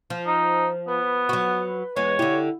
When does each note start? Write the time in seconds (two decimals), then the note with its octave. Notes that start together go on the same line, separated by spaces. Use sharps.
0.10 F3
0.27 D#4
0.88 B3 B4
1.29 F#3 F#4
1.96 E2 G#3 C#5
2.19 D3 E4 G4